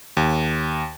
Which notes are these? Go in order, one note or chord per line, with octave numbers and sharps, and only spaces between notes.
D#2